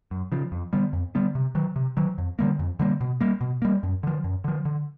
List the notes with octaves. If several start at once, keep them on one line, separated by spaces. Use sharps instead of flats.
F#2
C#3 F3
F2
D3 G3 B3
F2
D3 G3 B3
C3
D#3 F#3
C3
D#3 F#3
F2
D3 G3 A#3
F2
D3 G3 A#3
B2
G3 A#3
B2
G3 A#3
F#2
D3 F3
F#2
D3 F3
D3